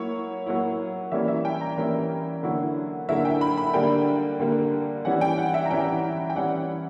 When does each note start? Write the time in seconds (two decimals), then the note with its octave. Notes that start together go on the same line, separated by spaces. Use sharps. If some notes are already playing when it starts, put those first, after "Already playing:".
Already playing: F#3 A#3 E4 C#5
0.46 F#3 A#3 E4
1.12 E3 G3 A#3 C#4 E4 E5
1.28 E5
1.45 G5
1.61 A#5
1.77 E3 G3 A#3 C#4 E4
2.43 D3 F#3 A#3 E4
3.09 D3 F#3 A#3 E4 E5
3.25 G5
3.41 B5
3.58 B5
3.74 D3 G3 A#3 G5
4.39 D3 G3 A#3
5.05 E3 G3 C#4 E4 F#5
5.21 G5
5.38 F#5
5.54 E5
5.65 A#5
5.70 E3 G3 C#4 E4 G5
6.30 G5
6.36 E3 G3 C#4 E4 F#5